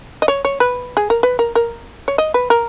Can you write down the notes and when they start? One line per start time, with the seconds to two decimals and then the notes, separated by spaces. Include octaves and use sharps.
0.22 D#5
0.28 C#5
0.45 C#5
0.60 B4
0.97 G#4
1.10 A#4
1.23 B4
1.39 A#4
1.55 A#4
2.08 C#5
2.18 D#5
2.34 B4
2.50 A#4